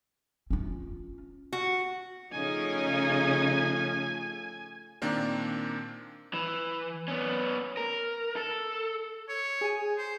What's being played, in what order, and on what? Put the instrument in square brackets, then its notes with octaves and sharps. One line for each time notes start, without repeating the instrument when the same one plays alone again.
[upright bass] C#4 F4
[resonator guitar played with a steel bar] F#4
[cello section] C#3 C#4 D#4 [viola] F3 A3 [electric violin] G#5
[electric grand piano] A#2 D#3 A#3 C4 D4 A#4
[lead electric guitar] E3
B3 C#4
A#4
A4
[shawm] C#5
[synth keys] G#4 G#5
[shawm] C5